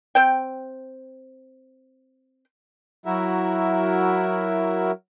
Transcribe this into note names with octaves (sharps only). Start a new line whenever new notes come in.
C4 G5
F#3 E4 F#4 A#4 E5